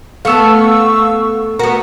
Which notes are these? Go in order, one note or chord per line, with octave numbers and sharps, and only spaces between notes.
A3 B3 A4 F5 C#6 E6
B3 F#4 A#4